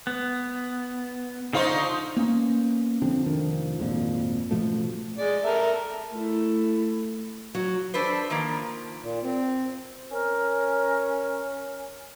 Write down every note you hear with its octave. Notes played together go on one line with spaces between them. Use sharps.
B3
D3 F3 D#4 C5 F5 C#6
A#3 B3 C#4
D3 F3 C4 D4
F1 D#3 F3 D4
G#1 F2 A#2 F3
A1 B2 F3 A3
G#3 D5
A4 A#4 E5
A3 E4
F#3
D4 A4 B4 C5
D#3 F3 A#3
A#2
C4
C#4 A#4